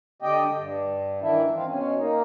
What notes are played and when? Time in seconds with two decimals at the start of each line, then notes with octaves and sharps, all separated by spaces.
0.22 D3 G4 D5 D#5 G5
0.56 G2
1.22 D#3 E3 D4 E4
1.55 C4 F4
1.67 B2 C#4
1.97 A#3 D#4